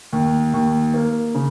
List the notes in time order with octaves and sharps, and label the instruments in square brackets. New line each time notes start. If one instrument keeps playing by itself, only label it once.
[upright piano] D#2
D#2
A#3
C#3